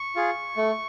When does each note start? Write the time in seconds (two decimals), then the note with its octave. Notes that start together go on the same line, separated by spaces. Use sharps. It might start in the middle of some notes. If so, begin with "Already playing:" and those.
Already playing: C#6
0.16 F4 G#4
0.57 A3